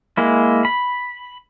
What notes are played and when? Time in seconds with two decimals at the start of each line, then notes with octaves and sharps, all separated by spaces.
0.17 G#3 A#3 E4
0.65 B5